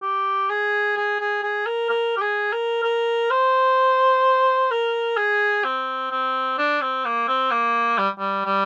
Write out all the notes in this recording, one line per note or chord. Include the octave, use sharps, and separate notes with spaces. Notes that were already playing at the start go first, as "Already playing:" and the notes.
G4
G#4
G#4
G#4
G#4
A#4
A#4
G4
G#4
A#4
A#4
C5
A#4
G#4
C4
C4
D4
C4
A#3
C4
A#3
G3
G3
G3